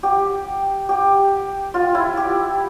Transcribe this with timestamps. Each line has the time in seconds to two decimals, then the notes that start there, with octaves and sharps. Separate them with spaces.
0.03 G4
0.89 G4
1.74 F4
1.95 E4
2.17 G4